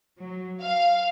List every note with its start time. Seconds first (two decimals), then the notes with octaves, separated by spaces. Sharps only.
0.18 F#3
0.61 F5